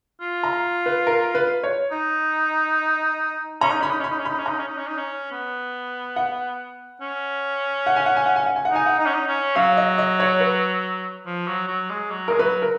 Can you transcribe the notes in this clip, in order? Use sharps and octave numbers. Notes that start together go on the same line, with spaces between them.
F4
A#5
B4
A#4
B4
C#5
D#4
C#4 A#5
D#4
C#4 B5
D#4
C#4 B5
D#4
C#4
D#4 B5
C#4
D#4 A#5
C#4
D#4
C#4
D#4
C#4
B3
F#5
C#4
F#5
G#5
F#5
G#5
F#5
G#5
F#5
G#5
F#5
D#4 G#5
F#5
D#4
C#4
D#4
C#4
F#3 F5
D#5
D#5
C#5
B4
F3
F#3
F#3
G#3
F#3
G#3 A#4
F#3 B4
A#4